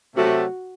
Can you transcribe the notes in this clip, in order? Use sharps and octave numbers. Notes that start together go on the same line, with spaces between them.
C3 F#3 A3 F#4